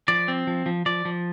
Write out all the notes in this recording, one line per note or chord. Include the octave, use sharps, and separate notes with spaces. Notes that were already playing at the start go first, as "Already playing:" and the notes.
F3 D5
C4
F3
F3
F3 D5
F3